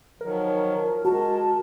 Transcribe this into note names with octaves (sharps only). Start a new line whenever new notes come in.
D#3 F3 F#3 A#4
G#3 F#4 A5